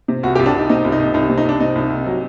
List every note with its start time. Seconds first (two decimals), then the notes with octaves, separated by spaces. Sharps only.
0.08 C3
0.23 C2 F#4
0.35 G4
0.39 C2
0.46 D4
0.53 C2 D#4
0.69 C3 D#4
0.85 C2
0.92 D#4
1.00 C2
1.14 C2 D#4
1.29 C3
1.38 D#4
1.45 C2 D4
1.60 C3 D#4
1.75 C2
1.90 C2
2.06 F#3